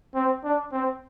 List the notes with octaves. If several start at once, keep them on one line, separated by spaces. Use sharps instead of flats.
C4
D4
C4